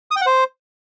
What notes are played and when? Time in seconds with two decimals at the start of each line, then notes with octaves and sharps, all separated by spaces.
0.11 D#6
0.16 G5
0.21 F#5
0.26 C5